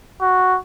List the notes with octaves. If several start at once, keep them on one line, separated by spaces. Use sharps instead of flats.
F#4